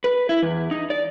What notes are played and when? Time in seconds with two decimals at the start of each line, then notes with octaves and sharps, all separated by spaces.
0.04 B4
0.29 E4
0.42 E2
0.71 D#4
0.90 D5